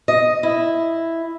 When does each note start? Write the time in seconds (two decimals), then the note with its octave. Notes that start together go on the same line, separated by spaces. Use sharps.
0.08 D#5
0.43 E4